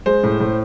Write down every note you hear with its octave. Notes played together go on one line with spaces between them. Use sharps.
G#3 C5
A2
A2